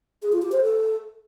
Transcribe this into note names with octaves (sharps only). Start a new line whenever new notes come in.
G#4
F4
G4
C5
A4